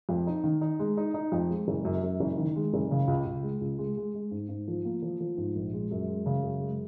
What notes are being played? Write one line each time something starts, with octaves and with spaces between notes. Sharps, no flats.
F2
D#4
D#3
D#4
G#3
D#4
D#4
F2
G#3
F#1
F#2
F#2
F#1
D#3
G#3
F#1
C#3
C#2
C#2
G#3
C#2
G#3
G#3
G#3
G#2
G#2
F3
A#3
F3
F3
G#2
A#1
G#3
F#2
G#3
C#3
F#2
G#3